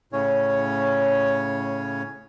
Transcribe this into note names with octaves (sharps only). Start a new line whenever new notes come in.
A2 C#3 C#4 C#5